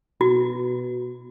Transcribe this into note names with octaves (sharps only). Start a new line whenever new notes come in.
B2 F#4